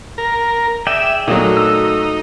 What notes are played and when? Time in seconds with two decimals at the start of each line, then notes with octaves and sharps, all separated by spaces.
0.18 A#4
0.87 G#4 D5 E5 G5
1.28 A#2 F#3 A3 D#4 F#4
1.57 E6